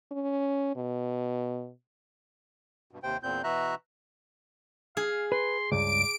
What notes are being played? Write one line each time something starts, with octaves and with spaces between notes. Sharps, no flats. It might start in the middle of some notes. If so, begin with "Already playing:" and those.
C#4
B2
G2 B2
D#2 C3 C5 G5
E2 A#2 C4 G6
B2 E3 F#4 E5 A#5 F#6
G#4 F5
B4 C6
C#2 G2 D6 D7